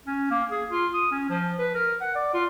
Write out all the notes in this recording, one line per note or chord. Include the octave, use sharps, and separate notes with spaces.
C#4
A#3
G#4
F4
D#6
C#4
F3
B4
A#4
F#5
D5
F4